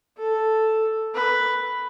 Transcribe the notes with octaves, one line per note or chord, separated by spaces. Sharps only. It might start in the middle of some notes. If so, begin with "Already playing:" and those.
A4
B4